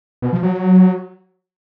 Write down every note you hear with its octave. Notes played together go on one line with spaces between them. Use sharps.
B2
F3
F#3